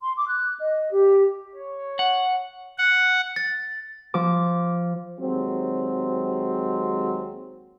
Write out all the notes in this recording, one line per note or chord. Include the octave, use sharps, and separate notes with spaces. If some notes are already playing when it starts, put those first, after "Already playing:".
C6
D6
F#6
D#5
G4
C#5
F#5
F#5
A6
F3 D6
D#2 F#3 G#3 C4